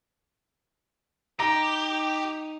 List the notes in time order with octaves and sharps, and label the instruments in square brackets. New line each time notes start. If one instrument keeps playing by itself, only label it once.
[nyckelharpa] D#4 [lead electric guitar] G4 [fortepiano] A#5